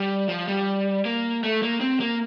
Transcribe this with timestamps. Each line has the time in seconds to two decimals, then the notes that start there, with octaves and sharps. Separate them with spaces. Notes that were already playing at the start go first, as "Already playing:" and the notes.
Already playing: G3
0.29 F3
0.48 G3
1.05 A#3
1.44 A3
1.63 A#3
1.81 C4
2.00 A#3